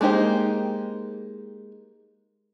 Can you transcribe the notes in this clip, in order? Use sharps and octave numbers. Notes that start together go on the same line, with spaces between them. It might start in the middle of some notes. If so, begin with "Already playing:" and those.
G#3 A#3 D#4 G4 C5